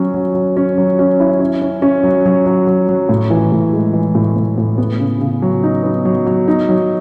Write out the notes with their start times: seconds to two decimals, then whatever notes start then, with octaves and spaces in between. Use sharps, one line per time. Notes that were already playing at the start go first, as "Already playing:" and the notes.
Already playing: F#3 C#4
0.14 F#3
0.35 F#3
0.57 C#4
0.78 F#3
0.99 C#4
1.20 E4
1.40 C#4
1.62 C#4
1.82 C#4
2.04 F#3
2.26 F#3
2.46 F#3
2.67 F#3
2.89 F#3
3.09 A2
3.30 E3
3.52 A2
3.73 G#3
3.94 E3
4.15 A2
4.36 A2
4.58 A2
4.78 B3
4.99 C#3
5.20 C#3
5.42 F#3
5.63 D#4
5.83 B3
6.05 F#3
6.26 F#3
6.48 D#4
6.69 F#3